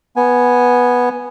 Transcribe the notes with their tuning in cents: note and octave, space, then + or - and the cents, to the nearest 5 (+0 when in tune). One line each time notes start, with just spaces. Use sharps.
B3 -5 G#5 +0